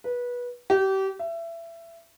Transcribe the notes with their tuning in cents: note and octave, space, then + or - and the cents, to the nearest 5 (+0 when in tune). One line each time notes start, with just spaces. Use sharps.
B4 -20
G4 -30
E5 +25